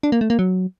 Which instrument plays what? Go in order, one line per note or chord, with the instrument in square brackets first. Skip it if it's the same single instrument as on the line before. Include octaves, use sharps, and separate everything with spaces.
[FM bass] D4
A#3
A3
A#3
F#3